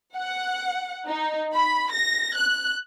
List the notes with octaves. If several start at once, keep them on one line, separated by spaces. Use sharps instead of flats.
F#5
D#4
B5
A#6
F#6